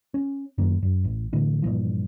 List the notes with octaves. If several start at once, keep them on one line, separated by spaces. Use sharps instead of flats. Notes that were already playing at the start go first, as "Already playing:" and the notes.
C#4
F#2 D#3 A#3
F#2
A1
A2 D3 E3
G2 A#2 E3 F3